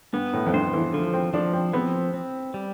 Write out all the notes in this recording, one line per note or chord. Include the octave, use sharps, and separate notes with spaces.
G2 B3
A2
F2
G2 C5
E3
D3 F3
C4
F3 D4
C4
B3 C4
C4
G3